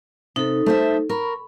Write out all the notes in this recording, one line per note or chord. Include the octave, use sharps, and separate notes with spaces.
C3 D#4 A4
A3 C5 E5
A#4 B5 C#6